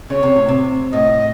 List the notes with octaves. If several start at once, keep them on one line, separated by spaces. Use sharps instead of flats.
C#3 C#5
C3
A2
C3
A2 D#5